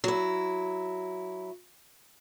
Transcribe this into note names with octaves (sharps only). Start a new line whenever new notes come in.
F#3 E4